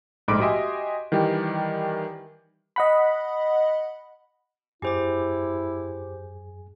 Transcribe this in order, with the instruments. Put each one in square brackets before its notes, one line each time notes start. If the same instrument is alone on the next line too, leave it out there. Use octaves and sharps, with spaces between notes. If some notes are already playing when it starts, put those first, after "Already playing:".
[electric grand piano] A#1 G#2 A3 B5 D6 D7
F#4 G4 D#5 E5 G#5 C6
D#3 E3 G3 G4
[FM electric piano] D#5 F#5 B5
[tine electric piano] F#2 G#4 G#5 [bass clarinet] E4 [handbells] G4 C5 D6